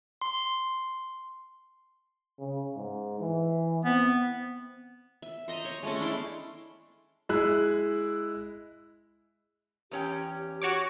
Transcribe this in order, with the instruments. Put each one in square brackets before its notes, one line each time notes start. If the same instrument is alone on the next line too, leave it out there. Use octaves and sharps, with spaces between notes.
[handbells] C6
[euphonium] C#3
G#2
E3
[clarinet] B3 [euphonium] C4
[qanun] E5
C5 D#5 A#5
C#5
G#3 A3 C#4
D4 E4 C6 D6
[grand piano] G#3 E4 F#6
[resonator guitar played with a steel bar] E2 C#4 G5 [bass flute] G4
[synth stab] F#4 C#5 D6